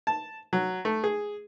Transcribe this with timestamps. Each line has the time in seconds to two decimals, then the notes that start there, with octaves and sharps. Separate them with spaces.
0.07 A5
0.53 F#3
0.85 A3
1.04 G#4